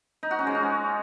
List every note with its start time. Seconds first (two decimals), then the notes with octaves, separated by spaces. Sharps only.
0.23 D#4
0.31 F#4
0.39 C#4
0.47 G#3
0.55 C#4